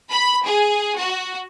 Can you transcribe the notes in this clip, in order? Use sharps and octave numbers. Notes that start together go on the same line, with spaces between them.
B5
G#4
F#4